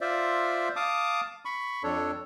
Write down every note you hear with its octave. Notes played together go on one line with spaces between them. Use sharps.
F4 C5 D5 E5
F5 A5 D6 D#6
B5 C#6
F2 D4 A4 C#5